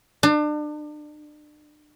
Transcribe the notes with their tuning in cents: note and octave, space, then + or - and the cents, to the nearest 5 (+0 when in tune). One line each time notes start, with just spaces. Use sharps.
D4 +35